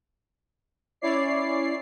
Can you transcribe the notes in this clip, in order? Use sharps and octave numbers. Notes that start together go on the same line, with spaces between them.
C#4 E4 C#5 D5 C7